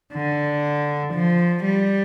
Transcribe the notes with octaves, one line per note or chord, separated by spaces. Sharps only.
D3
F3
G3